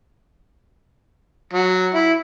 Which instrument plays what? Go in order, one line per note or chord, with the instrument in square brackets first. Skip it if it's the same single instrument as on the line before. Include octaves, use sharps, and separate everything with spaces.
[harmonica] F#3
E4